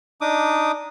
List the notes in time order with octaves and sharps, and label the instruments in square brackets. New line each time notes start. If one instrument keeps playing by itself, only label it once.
[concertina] D4 D#4 D6 D#6